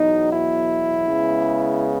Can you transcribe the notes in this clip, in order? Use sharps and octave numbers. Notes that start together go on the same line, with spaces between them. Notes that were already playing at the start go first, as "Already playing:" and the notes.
Already playing: E2 B2 F#3 D#4
E4
C#3 G#3 B3